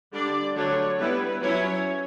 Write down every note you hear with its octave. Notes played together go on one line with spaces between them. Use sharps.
D3 G3 D4 D5
D3 F#3 A3 D4 C#5
G3 B3 E4 B4
F#3 C#4 E4 C#5